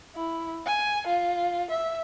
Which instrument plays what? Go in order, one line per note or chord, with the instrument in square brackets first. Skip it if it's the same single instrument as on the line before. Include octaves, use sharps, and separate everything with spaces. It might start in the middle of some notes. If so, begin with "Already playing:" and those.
[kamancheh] E4
G#5
F4
E5